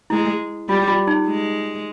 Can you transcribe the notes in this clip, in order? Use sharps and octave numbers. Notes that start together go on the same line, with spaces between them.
G#3 E4
G3 F4
F4
D#4
G#3